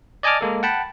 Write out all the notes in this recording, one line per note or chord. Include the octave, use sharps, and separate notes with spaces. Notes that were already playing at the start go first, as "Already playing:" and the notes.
D5 D#5 G#5 A5 D6 F6
G#3 A#3 A4
F#5 G5 A5 B5